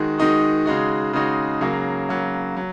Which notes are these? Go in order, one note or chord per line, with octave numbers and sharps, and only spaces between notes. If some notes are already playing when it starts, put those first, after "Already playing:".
Already playing: D#3 G#3 D#4 F#4
D#3 G#3 D#4 F#4
C#3 G#3 D#4 F#4
C#3 G#3 D#4 F#4
C#3 F#3 A#3
C#3 F#3 A#3
F#3